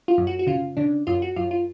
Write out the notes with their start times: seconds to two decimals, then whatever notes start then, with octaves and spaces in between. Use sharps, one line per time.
0.08 F4
0.18 F#2
0.27 F#4
0.39 F#4
0.47 C#3 F4
0.77 C#3 D4
1.07 F#2 F4
1.22 F#4
1.36 F#2 F4
1.51 F4